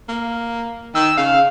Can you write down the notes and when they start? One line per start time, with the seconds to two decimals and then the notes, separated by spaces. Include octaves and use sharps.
0.09 A#3
0.95 D#3 E6
1.18 C#3 F5